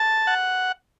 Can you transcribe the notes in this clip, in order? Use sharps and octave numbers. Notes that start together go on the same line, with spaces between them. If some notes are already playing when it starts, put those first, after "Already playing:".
Already playing: A5
F#5